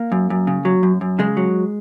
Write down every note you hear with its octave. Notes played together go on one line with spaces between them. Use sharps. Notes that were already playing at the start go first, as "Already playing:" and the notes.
Already playing: A#3
F#2
F#2
C#3
F#3
F#2
F#2
C#3 G#3
F#3